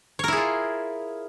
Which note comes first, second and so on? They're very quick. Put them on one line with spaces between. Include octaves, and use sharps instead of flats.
C#5 A#4 E4 G#4 F4